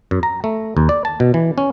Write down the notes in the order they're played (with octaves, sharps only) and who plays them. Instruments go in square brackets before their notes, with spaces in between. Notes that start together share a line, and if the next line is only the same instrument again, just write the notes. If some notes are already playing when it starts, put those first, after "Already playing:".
[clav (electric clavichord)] F#2
A#5
A3
D#2
D5
A5
B2
E3
C#4